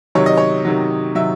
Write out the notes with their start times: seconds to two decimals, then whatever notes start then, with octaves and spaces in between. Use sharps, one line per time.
0.15 C3 D#3 F#3 C#5
0.26 D#5
0.37 C#5
0.65 C3 D#3 F#3
1.15 C3 D#3 F#3 E5